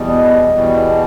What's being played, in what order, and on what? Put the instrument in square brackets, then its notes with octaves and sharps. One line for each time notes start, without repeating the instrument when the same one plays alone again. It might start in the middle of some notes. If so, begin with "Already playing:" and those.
Already playing: [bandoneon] E2 B2 G3 [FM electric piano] D#5
[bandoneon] E2 B2 G3